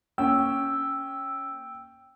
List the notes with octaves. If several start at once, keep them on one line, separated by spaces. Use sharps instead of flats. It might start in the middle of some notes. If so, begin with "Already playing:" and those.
A#3 C#4 G5 E6